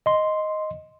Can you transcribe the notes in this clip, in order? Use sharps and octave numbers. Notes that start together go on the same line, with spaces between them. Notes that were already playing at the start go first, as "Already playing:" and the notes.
D#5 C6